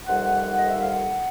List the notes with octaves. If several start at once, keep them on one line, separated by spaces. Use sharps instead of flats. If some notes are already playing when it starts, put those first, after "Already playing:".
F2 C3 D#3 G3 F#5
D#5
E5
F5
F#5